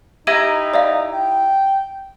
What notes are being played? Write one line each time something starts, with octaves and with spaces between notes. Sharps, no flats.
D#4 E4 G4 A#5 D#7
D5 E5 F5
G5